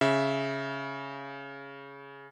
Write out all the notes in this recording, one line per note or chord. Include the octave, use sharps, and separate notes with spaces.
C#3 E5